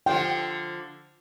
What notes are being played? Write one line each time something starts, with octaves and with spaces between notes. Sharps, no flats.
D3 F3 F4 G5